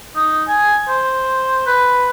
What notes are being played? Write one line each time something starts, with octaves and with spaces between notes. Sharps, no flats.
D#4
G#5
C5
B4